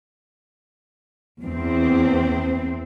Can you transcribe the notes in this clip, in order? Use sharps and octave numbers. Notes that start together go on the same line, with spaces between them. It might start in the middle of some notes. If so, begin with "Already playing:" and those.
E2 C4